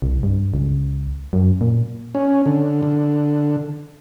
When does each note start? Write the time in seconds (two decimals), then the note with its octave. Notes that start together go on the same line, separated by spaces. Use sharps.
0.02 C2
0.23 G2
0.54 C#2
1.33 F#2
1.61 A#2
2.15 C#4
2.46 D3
2.83 D3